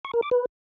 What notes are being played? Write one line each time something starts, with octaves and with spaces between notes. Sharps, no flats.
C#6
A#4
D6
B4